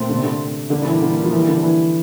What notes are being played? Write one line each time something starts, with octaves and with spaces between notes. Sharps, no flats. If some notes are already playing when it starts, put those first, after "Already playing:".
Already playing: A#2 A3 C4
D3
C3
D3
A#2 D3 G3 A#3
D3
E3
D3
F3
E3
D3
E3